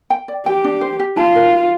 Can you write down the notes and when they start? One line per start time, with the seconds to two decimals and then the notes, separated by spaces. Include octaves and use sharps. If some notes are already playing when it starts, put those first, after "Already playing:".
0.10 G5
0.28 D5
0.46 G4 G5
0.64 D4
0.81 C5
0.99 G4
1.17 F4 A5
1.35 A#4
1.53 F5